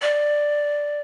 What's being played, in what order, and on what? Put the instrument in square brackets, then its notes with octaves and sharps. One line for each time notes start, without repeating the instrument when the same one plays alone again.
[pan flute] D5